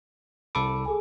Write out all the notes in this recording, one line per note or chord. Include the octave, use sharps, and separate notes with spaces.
C2 A4 B5 D6
G#4 A4 G#5